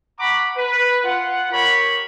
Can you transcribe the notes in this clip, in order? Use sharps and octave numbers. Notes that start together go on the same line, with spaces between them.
F#5 A#5 B5 C#6 D6
B4
F4 F#5
G4 A#4 C#5 B5